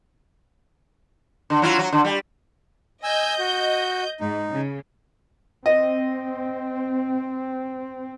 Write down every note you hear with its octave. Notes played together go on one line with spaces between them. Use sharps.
D3
F#3 E4 F4
F#3
D3
G3
D#5 G#5 E6 G6
F#4
G#2 D#4
C#3
C4 D#5